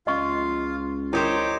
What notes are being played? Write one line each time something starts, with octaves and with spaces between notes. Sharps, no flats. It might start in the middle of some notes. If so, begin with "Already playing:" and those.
C#2 F4 D#5 F5 C#6
D#4 E4 G4 A#4 C5 C#5 D6